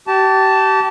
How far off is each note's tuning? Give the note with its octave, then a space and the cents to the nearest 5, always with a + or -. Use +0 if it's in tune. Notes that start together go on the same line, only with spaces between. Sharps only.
G4 -35 A5 +0